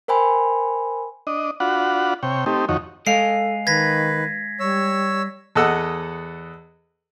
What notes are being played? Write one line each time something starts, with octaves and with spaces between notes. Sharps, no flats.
A#4 C5 G5 G#5 B5 C6
D4 D#5
D4 F4 F#4 F#5 B5
C3 C#5 G5
A3 C4 D#4 G4
F2 D#3 D#4 F#4 C#5
G#3 A4 D#5 F5 C7
D#3 B4 G#6 A#6 B6
G3 C#5 E6
E2 A4 D#5 F#5 E6